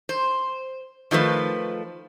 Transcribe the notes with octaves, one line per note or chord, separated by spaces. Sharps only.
C5
D#3 F3 A3 B4